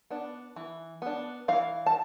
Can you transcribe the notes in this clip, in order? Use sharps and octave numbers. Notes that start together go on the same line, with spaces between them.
B3 D4
E3
B3 D4
E3 F5
A5